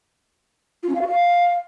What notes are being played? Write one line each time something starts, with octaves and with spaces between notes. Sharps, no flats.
F4
C#4
F5
F#4
F5